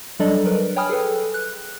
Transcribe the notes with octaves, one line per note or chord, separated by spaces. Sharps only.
F#3 G3 D4 A4 D5 D#5
F#3 A#4 B4
C#5 G5 G#5 B5 D#6 F6
G#4 A4 B4
F#6